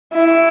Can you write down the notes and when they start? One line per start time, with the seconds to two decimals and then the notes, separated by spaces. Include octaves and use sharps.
0.14 E4